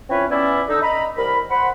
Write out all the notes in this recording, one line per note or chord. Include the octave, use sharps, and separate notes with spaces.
E3 C4 C#4 F4 B4 C#5
B3 C#4 E4 D5
D3 D4 D#4 E6
D#5 A#5 B5
C2 A#4 B5
C5 F#5 B5